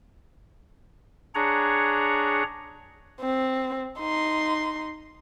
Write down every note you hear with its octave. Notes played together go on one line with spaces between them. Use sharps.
D4 G#4 C#5 F#5 A#5
C4
D#4 C6